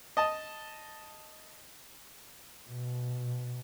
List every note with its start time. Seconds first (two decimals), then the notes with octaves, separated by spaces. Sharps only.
0.17 D#5 A5
2.69 B2